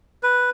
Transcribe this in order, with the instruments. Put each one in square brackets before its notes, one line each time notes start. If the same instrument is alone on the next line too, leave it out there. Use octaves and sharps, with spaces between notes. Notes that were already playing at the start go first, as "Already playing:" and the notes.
[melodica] B4